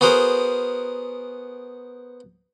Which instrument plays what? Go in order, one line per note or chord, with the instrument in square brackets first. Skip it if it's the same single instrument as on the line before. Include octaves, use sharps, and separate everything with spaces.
[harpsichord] B3 F#4 G#4 A#4 C5